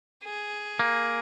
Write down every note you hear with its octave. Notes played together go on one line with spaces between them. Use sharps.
G#4
A#3